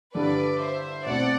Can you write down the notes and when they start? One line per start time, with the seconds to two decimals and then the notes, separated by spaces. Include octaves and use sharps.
0.15 G2 D3 G3 D4 A4 B4 D5
0.60 C5 E5
1.06 B2 A3 C4 D5 F#5